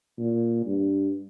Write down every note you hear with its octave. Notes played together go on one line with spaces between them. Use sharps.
A#2
G2